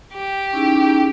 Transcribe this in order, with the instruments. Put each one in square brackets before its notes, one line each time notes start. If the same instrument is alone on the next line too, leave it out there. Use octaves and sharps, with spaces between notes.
[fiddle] G4
[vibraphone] C#4 E4 G#4 [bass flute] D#4